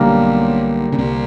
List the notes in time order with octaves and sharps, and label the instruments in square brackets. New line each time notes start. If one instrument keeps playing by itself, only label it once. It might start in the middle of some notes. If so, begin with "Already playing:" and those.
Already playing: [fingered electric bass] B1 B2 [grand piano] D3 G3 A#3
[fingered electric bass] C#3
C2 C3